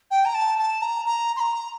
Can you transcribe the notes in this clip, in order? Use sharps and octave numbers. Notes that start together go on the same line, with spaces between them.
G5
A#5
A5
A5
A#5
A#5
C6
A#5